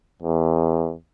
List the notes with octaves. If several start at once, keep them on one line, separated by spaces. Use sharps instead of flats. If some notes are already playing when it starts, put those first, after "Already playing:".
E2